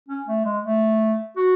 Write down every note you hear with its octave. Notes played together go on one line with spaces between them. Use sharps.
C#4
A3
G#3
A3
F#4